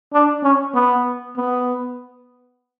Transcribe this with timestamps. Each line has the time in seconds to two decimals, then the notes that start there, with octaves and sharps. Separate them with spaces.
0.13 D4
0.43 C#4
0.74 B3
1.37 B3